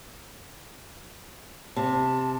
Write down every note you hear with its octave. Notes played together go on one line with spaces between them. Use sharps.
C3 A5